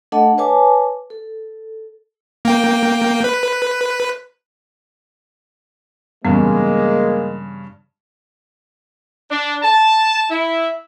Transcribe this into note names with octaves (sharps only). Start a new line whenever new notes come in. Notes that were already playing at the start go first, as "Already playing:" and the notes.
A3 D4 A4 D#5 F#5 A5
B4 C#5 G#5 A5 D6
A4
A#3 G5
B4
G2 C#3 E3 G3 G#3 A#3 B3
D4
A5
E4